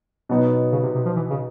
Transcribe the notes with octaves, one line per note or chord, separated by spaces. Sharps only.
B2 F#3 B3 D#4
C#3
C3
C3
F3
E3
C#3